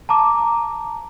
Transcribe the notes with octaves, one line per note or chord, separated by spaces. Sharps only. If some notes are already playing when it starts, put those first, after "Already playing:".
A5 A#5 D6